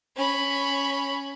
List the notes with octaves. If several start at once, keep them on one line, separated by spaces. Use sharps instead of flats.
C#4 B5